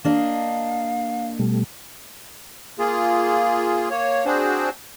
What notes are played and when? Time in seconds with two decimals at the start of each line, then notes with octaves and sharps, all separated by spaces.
0.04 A#3 D4 D#5 F5
1.39 B2 G3 A3
2.79 A#3 F4 G#4
3.90 A#3 C#5
4.25 C4 D4 F#4 G#4 C5